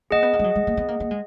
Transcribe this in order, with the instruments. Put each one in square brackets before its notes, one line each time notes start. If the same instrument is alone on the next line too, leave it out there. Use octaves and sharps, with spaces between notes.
[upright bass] A#3 [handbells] G#4 D#5 F#5
[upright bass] B3
A#3
G#3
F#3
G#3
A#3
B3
A#3
A#3
G#3